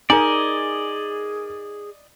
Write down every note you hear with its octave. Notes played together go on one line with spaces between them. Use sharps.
D#4 G#4 A#4 D5 D#5 G#5